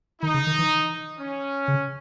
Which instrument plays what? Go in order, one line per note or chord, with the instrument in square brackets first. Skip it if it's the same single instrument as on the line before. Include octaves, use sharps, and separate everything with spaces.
[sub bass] D#3 [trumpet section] D#4
[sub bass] C#3
D#3
E3
[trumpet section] C#4
[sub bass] C#3